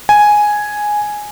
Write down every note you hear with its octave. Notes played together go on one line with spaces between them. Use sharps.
G#5